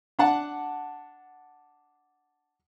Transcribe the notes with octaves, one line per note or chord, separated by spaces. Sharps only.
D4 F#5 A5